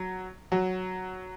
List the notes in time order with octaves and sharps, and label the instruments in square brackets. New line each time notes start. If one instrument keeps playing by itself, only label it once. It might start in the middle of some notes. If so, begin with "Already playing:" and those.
Already playing: [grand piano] F#3
F#3